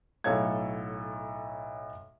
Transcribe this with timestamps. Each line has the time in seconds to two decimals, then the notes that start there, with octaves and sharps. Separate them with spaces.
0.24 B1 A2 A4 C#5 F5 G#6